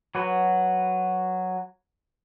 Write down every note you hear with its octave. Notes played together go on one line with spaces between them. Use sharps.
F#3 F#4 B4